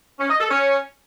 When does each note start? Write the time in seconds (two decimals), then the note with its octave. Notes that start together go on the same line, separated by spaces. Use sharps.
0.19 C#4
0.29 D#5
0.40 A4
0.50 C#4